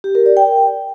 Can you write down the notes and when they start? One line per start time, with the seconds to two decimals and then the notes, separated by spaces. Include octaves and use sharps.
0.04 G4
0.15 A#4
0.26 D5
0.37 G5